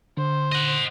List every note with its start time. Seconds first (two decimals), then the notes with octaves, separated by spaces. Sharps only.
0.17 D3 C5
0.52 D#5 F#5